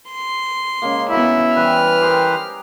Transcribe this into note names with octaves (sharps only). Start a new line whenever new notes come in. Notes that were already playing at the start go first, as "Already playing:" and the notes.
C6
C#3 G#3 A#3
B3 E4 F#4 E5 B5
E3 G3 B4 C5 F6
G4 G#4 A#4 C5